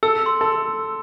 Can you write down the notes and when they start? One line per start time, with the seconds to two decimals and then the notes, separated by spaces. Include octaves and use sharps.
0.03 A4 E6
0.26 C6
0.41 A4